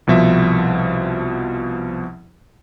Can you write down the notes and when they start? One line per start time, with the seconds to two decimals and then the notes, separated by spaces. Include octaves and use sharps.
0.07 C2 B2 F3 E5